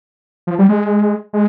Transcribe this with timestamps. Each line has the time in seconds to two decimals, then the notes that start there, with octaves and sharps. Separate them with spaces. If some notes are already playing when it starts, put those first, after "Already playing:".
0.47 F3
0.59 G3
0.69 G#3
1.33 G#3